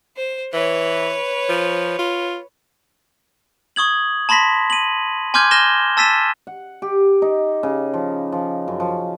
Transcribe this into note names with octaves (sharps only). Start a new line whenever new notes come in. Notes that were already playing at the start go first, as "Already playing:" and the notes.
C5
E3 B4 C#5
F3
F4
C#6 D#6 G#6 F#7
A5 B5 C6 A#6 B6
D#7 F#7
G#5 C6 D6 F6 G6 G#6
F6 G6 A#6 E7 G7
A5 E6 A6 B6 D#7 E7
F#5
G4
D#4
C#3
F3
F3
F#2
F3